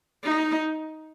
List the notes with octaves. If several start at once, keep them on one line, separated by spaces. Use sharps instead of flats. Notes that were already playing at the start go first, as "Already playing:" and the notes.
D#4